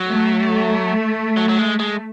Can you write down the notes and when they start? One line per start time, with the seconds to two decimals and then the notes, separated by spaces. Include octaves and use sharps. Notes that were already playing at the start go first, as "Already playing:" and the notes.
Already playing: F#3
0.10 A3
1.37 F#3
1.49 F#3
1.58 G#3
1.80 G#3